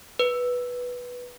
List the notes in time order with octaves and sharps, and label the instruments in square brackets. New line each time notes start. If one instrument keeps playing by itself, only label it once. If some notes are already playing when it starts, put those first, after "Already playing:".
[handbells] B4